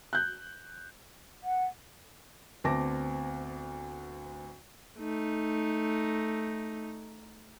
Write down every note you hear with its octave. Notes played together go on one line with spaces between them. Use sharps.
F#6 G6
F#5
D2 B3 C4 A5 D6 A#6
A3 D#4